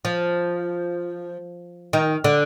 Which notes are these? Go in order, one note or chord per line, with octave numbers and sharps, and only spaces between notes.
F3
D#3
D3